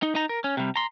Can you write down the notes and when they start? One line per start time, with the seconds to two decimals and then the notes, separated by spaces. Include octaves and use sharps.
0.03 D#4
0.15 D#4 A#5
0.29 A#4
0.44 C#4
0.57 C3 G3
0.76 A#5 C6